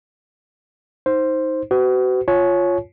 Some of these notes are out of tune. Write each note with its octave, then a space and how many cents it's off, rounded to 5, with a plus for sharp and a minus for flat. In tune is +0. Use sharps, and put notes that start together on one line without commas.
D#4 +20 C5 +5
F#4 +35 B4 +45
F4 +0 C#5 +0 G#5 +45